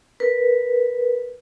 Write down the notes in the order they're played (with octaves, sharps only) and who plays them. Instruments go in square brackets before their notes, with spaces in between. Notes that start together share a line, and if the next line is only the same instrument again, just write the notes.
[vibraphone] A#4 B4